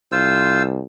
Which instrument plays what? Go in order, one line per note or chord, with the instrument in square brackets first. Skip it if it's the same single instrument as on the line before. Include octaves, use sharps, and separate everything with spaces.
[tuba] C2 [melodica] F4 C5 E6